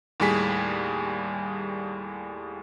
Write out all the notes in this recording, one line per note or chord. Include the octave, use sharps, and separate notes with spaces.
D#2 A2 G3 G#4 B6